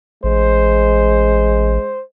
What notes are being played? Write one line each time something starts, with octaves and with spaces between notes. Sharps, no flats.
A1 G#3 C5